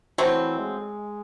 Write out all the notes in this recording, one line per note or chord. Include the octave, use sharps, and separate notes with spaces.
E3 F#3 A3 C4
G#3